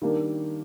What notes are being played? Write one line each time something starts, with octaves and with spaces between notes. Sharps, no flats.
D#3 G3 A#3 D4